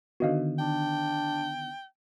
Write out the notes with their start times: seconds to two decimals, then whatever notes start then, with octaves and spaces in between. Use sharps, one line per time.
0.20 D3 D#3 B3 F#4 D#5 F5
0.59 D4 G5